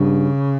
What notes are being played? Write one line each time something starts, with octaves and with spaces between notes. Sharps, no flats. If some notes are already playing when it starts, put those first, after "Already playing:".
Already playing: G2 C#3